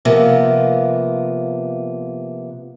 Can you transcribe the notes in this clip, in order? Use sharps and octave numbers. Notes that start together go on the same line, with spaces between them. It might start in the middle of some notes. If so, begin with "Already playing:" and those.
C3 F3 A#3 B3